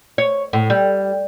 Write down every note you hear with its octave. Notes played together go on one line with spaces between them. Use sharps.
C#5
A2
G3